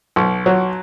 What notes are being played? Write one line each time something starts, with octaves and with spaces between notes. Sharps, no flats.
B1
F#3